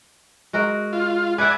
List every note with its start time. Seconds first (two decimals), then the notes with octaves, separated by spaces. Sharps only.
0.53 G#3 F#4 A#4
0.93 F4
1.38 B4 D5 E5 F#5 G#5